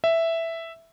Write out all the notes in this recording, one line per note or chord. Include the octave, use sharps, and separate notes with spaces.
E5